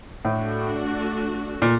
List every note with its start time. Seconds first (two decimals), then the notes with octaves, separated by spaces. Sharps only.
0.25 A2 A3 D4 F#4
1.62 A#2